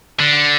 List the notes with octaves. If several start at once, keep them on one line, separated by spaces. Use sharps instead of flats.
D3